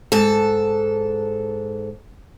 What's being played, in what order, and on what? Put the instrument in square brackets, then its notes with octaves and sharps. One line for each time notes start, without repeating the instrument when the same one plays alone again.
[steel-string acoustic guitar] G#2 A4